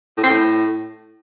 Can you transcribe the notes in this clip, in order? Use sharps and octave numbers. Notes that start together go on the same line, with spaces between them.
A2
C4
A2